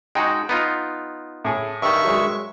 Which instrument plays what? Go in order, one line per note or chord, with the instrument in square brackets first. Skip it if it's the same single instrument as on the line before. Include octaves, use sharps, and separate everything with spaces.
[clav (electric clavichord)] G#3 D#4 F#4 [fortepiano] G5
[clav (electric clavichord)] B3 D#4 F4
[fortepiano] A2 G#4
[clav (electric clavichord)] G2 D#3 [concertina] E5 C#6
[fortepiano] F#3 G#3